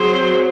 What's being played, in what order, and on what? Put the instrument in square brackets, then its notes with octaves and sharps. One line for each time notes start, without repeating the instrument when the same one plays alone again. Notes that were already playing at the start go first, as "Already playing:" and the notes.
Already playing: [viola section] F#3 C4 G#4 C5